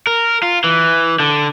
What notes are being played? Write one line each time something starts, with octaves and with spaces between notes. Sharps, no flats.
A#4
F4
E3
D3